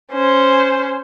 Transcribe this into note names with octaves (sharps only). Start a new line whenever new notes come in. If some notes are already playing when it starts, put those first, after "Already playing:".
C#4 C5